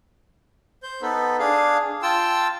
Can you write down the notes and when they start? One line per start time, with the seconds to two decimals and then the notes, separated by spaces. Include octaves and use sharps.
0.83 C5 G6
1.02 B3 D#4 A4 B4
1.39 D4 G#4 F5
2.02 F4 G5 A5 E6